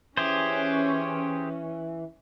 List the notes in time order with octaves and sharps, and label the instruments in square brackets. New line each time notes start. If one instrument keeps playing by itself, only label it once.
[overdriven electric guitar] E3 [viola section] C#4 [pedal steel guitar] G4 G#4 C5